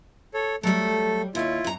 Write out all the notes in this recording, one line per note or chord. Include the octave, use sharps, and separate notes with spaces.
A4 C#5
F#3 G3 A3 A4
D#2 E4 F4 C#5
F#2 A#5